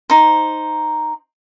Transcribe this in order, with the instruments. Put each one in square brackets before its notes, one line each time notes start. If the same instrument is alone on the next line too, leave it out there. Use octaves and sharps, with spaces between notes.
[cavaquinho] D#4 C5